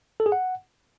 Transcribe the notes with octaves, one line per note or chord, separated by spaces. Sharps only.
A4
G#4
F#5